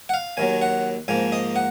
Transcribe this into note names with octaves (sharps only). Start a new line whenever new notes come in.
F#5
F5
D#2 D#3 F#3 G#5
F#5
G#2 F3 A#3 G#5
D#5
F#5